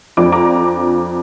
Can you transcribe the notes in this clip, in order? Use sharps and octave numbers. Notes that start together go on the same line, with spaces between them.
F2 F3 D4 D6
A#5 D6